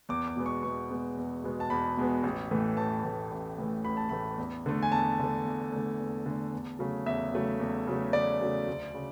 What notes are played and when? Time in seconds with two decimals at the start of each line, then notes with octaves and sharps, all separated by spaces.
0.09 E2 D6
0.28 D6
0.36 B2 G#3 B3
0.46 C#6
0.63 E2 C#6
0.90 B2 G#3 B3
1.17 E2
1.44 B2 G#3 B3
1.60 A5
1.70 E2 B5
1.97 B2 G#3 B3
2.23 A1
2.51 A2 E3 A3
2.77 A1 A5
3.04 A2 E3 A3
3.31 A1
3.58 A2 E3 A3
3.84 A1 B5
3.97 A5
4.09 A2 E3 A3 B5
4.38 E2
4.66 D3 A3
4.83 G#5
4.92 E2 A5
5.19 D3 A3
5.45 E2
5.72 D3 A3
5.99 E2
6.26 D3 A3
6.53 E2
6.79 C#3 F#3 A3
7.06 E2 E5
7.34 C#3 F#3 A3
7.60 E2
7.87 C#3 F#3 A3
8.13 E2 D5
8.41 C#3 F#3 A3
8.67 D2
8.94 C#3